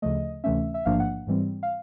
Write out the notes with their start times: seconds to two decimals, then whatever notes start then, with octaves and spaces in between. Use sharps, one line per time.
0.02 D2 C#3 F3 A3 D#5
0.44 D2 C3 E3 A3 C#4 E5
0.74 E5
0.85 A1 G#2 F3 A#3 D4 F5
1.00 F#5
1.27 G#2 E3 G3 C4
1.63 F5